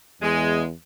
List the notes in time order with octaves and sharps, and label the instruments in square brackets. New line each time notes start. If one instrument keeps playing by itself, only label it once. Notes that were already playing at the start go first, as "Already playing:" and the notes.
[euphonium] E2 [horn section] G#3